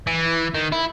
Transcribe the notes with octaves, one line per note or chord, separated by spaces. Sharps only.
E3
D#3
E4